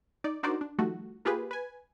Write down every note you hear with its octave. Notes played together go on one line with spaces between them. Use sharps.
D#4 D5
D4 D#4 F#4 A#4 C5 D5
D4
D#3 F3 G3 A3 F#4
A#3 F4 G4 G#4 B4
B4 G#5